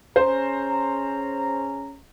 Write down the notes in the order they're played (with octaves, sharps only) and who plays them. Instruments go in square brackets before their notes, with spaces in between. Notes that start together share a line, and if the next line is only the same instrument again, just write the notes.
[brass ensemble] C#4 G#4 A#5 [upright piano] C5